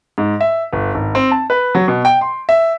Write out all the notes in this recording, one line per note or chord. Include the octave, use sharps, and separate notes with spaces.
G#2
E5
G1
G#1
C4
A5
B4
F#3
B2
G5
C6
E5